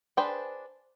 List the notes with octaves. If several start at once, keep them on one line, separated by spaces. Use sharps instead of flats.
D4 G#4 B4 C5 G5